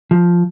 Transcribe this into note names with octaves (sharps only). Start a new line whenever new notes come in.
F3